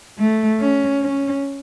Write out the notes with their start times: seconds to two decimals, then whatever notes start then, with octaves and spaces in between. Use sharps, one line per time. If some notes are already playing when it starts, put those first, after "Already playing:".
0.19 A3
0.60 C#4
1.02 C#4